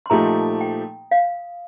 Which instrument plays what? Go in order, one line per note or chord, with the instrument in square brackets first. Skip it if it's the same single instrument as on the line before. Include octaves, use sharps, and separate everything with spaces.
[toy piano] C6
[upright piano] A#2 F3 A3 D#4 G4 [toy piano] A#5
[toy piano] G5
F5